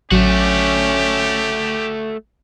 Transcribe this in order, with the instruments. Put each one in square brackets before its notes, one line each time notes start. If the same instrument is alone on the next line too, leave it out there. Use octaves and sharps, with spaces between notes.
[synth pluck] A1 F#3 [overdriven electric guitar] A3 F#4 [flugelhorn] C#4 [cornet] G4